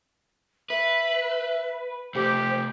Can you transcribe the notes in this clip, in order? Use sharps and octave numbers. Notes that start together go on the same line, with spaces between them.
B4 E5
C3 A3 G4 C5